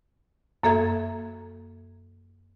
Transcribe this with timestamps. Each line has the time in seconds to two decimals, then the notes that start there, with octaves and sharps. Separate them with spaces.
0.63 F#2 A#3 A4 E5 G#6